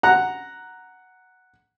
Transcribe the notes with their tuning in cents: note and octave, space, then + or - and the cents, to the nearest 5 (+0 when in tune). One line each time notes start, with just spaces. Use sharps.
F#5 +0 A#5 +0